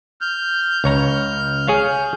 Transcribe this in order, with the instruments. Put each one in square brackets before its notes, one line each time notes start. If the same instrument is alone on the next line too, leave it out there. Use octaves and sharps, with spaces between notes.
[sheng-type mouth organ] F6 G6
[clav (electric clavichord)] C#2 C#5 A#5
G#4 C#5 F5